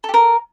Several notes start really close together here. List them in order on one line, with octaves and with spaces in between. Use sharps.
A4 G4 A#4